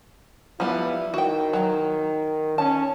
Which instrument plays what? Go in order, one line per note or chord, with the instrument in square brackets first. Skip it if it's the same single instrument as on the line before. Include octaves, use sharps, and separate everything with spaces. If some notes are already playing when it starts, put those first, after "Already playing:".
[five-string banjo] F3 G3 B3 [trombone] E4
[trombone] D#3 [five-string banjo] F#4 G5
[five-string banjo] F#3
[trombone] C#4 [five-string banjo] A5